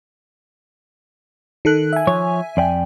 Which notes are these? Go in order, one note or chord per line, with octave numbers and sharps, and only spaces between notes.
D#3 A4 F#6
E5 G#5
F3 C#5
F2 D5 G5